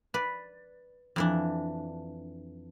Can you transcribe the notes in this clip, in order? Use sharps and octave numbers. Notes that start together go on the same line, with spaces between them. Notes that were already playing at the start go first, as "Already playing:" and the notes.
B4 D5
F2 E3 D4